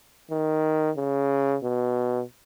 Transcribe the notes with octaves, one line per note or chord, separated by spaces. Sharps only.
D#3
C#3
B2